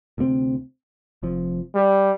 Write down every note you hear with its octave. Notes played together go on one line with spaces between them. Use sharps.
D2 C3 G3 C4
F1 F2 F3
G3